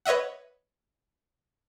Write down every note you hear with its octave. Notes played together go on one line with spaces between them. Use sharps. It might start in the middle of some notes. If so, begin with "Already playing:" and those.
B4 C#5 D#5 E5 F#5